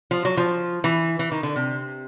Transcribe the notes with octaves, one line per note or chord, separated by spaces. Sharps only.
F3
F#3
F3
E3
E3
D#3
D3
C3